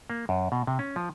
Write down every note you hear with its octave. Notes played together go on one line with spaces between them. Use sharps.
A#3
F#2
B2
C3
C#4
F3